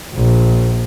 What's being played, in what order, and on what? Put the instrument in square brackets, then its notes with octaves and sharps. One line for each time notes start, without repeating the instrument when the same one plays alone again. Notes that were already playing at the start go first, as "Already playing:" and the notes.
[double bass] A#1